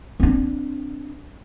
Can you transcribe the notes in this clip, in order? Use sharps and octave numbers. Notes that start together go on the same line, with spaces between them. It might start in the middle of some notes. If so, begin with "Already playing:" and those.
C4 D4